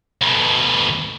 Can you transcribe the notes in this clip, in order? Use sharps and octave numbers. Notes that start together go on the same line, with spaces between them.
D2 B2